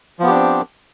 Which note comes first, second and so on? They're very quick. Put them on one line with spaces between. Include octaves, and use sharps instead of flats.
F3 B3 G4 D4 C4